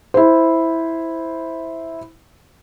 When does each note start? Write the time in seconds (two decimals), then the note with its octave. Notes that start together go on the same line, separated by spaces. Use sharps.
0.14 E4 C5